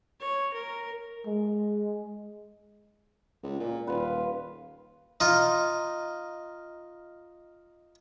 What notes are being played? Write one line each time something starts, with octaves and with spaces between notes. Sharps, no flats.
C#5
A#4
G#3
C#2
A#2
D#1 F4 B4
D#4 F4